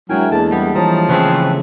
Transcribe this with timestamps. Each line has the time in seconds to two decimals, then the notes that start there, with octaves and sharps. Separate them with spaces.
0.10 F#3 G#3 D4 E4 A#4 G5 G#5
0.32 E2 A#3 G#4 A4 A5
0.52 G3 B3
0.75 E3 F3 C#5 A5 A#5 D#6
1.09 C#3 A3 C4 G#4 B4